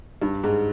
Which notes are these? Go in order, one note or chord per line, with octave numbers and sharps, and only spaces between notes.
G2
G#2